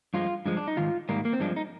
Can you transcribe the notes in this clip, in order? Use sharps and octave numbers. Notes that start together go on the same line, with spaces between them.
G2 F3 G#3 F4
G2 F3 G#3
D4
D#4
G#2 D#3 F4
G#2 D#3 G3 A#3
A#3
C4
G2 F3 G#3 D4
D#4